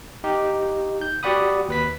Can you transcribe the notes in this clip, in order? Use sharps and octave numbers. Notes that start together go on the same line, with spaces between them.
D#4 G4
G6
F#4 G4 D5 F#5 B5 D#6
D#2 B4 B6